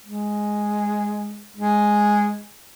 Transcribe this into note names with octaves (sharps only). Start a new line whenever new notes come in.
G#3
G#3